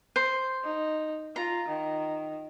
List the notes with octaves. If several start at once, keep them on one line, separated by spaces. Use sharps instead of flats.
C5
D#4
F4 A#5
D#3